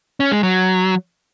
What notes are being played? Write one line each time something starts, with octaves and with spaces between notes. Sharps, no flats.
C#4
G#3
F#3